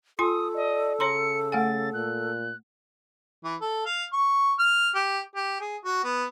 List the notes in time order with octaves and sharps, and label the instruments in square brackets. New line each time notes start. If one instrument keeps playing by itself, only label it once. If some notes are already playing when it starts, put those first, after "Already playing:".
[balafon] F4 G#5 C6 [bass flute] A4 [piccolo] D#6
[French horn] D5 [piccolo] D#5
[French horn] C#3 [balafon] C#5 A#5 C6 [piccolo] C#7
[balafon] A3 F#5 G#5 [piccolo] A6
[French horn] A#2 [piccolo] F#6
[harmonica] E3
A4
F5
C#6
F6
G4
G4
G#4
F#4
B3